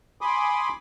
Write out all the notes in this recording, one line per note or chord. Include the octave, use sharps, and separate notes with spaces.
G#5 B5 C6 D6 D#6